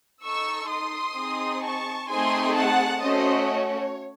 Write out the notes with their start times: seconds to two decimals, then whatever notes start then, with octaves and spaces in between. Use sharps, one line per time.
0.24 D#4 A4 C#6 E6
0.70 C6 D#6
1.16 C4 D#4 G#4
1.63 A5 C#6
2.09 A3 C4 D#4 G#4 G#5 C6
2.55 F#5 A5
3.02 A3 C#4 F#4 C5 D#5
3.48 C#5